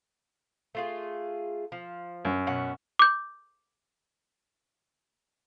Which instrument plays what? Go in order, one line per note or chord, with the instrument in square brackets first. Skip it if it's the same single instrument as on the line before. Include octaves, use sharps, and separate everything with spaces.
[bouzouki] A3 F4 G#4
F3
[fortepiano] F#2
[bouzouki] B2 C#4 F#5
[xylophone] D6 G6